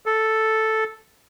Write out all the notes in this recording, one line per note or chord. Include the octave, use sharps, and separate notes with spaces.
A4